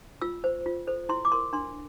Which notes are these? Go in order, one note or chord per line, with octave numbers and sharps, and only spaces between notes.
F4 E6
C5
F4
A4 C5
E4 C6
D6
A#4 C6
D4 C6